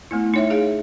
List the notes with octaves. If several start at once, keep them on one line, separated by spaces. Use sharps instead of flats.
A3 B3 E4
D#4 C#5 E5
G#4 F5